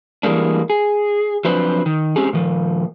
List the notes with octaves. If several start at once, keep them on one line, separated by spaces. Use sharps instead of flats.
E3 G3 G#3 A#3 D4
G#4
F3 F#3 C4 D4 B4 C5
D#3
G#3 C4 C#4 G4 G#4
A#2 D#3 F3